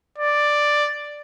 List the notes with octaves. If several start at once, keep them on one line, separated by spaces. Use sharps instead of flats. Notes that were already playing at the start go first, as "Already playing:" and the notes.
D5